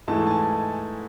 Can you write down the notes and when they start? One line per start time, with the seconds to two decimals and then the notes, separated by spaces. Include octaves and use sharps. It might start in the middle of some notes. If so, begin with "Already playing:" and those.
0.08 G#2 E3 A3 A5
0.27 A5
0.31 G#5